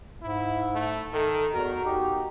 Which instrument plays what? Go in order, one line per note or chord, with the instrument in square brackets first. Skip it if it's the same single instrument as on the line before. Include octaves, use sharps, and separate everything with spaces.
[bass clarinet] G#2 [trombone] E4
[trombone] A3
[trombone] D#3 [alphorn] A4
[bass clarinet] E2 [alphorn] F#4 [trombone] A#4
[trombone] D#4 [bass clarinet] G4